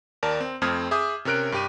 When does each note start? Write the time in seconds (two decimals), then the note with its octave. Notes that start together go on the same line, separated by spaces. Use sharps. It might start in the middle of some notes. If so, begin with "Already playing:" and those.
0.23 D#2 A#4 D5 A5
0.40 C4
0.62 F2 A3 C4 D#6 F6 G#6
0.91 G#4 E5 D6 D#6 G6
1.25 C3 C#4 A#4 F#6 D7
1.52 G2 G4 D#7